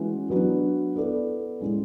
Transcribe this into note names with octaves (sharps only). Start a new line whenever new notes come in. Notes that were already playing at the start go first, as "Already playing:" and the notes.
Already playing: E3 G#3 C#4 F#4 B4
F#3 B3 D4 F#4 B4
B3 E4 A4 D5
A2 G#3 C#4